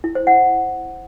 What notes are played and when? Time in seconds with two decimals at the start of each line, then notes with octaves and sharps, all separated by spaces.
0.04 E4
0.15 C5
0.27 F#5